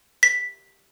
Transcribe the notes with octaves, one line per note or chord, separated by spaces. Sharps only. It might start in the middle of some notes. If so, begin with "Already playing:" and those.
B6